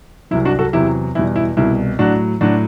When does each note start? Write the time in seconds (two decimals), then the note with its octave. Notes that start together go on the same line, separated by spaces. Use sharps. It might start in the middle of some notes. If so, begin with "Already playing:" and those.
0.31 C2 C3 F#3 E4
0.45 D4 F#4
0.59 F#4 A4
0.73 E2 C3 F#3 E4 G4
1.15 E2 B2 G3 E4
1.36 E4
1.57 C2 B2 G3 E4
1.99 A2 F#3 D4 F#4
2.41 A2 F#3 D4 F#4